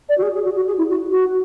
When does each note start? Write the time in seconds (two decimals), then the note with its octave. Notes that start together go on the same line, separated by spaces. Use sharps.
0.09 D5
0.18 F#4
0.22 G#4
0.34 G#4
0.45 F#4
0.56 F#4
0.67 G#4
0.78 E4
0.89 F#4
1.11 F#4